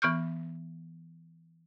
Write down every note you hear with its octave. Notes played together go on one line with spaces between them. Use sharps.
E3 B3 C#6 F6 G6